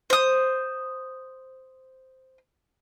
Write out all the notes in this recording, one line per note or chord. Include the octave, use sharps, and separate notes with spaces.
C5 D#6